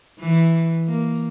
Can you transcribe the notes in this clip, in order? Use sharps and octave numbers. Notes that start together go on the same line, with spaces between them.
E3
A#3